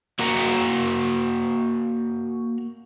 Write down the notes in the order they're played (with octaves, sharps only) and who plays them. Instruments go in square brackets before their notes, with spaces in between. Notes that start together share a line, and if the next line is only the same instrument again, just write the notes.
[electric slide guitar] A#3 F#4 A#4 F#5 A#5